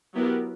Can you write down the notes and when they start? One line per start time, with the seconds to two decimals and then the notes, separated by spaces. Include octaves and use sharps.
0.14 F#3 B3 E4 G4 A#4